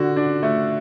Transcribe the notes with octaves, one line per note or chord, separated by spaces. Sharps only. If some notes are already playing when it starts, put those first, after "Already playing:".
Already playing: D3 F#4
D4
A3